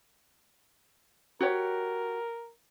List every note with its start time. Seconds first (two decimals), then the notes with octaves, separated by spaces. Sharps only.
1.41 F#4 G4 A#4 C#5